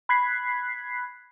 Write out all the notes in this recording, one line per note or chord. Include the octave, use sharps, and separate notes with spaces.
B5 F#6 G#6 B6 C7